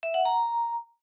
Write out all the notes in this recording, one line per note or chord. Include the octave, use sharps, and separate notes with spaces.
E5
F#5
A#5